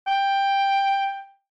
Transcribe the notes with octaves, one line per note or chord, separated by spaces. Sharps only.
G5